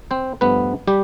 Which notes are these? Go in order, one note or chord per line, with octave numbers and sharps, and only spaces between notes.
C4 C5
G2 F3 A3 B3 B4
G3 G4